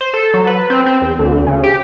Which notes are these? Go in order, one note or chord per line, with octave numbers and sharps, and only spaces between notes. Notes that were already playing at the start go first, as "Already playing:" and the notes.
C5
A4
F#3
B4
C4
C4
E2
D2
C#3
G4